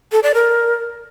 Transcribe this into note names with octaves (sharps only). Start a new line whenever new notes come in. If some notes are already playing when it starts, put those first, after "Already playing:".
A4
D5
A#4